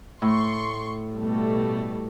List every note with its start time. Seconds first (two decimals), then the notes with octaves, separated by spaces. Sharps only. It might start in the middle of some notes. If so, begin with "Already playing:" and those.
0.22 A2 C6 C#6
1.13 B2 G3 A3